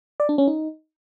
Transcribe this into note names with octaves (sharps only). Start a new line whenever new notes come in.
D5
D4
C#4
D#4